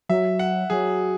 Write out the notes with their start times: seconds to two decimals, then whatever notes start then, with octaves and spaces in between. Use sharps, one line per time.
0.09 F#3 E5
0.39 F#5
0.70 F#3 G#4